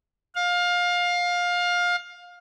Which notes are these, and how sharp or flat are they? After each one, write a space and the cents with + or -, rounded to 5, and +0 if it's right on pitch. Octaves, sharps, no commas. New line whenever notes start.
F5 +20